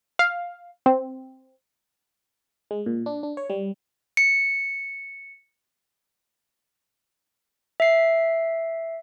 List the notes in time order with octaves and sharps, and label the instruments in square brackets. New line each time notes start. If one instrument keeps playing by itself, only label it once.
[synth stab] F5
C4
[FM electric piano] G#3
A#2
D4
D4
C#5
G3
[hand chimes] C#7
[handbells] E5 C7